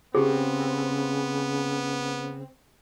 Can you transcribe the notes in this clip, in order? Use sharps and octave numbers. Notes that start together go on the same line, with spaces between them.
C#3 B3 C4 G4 G#4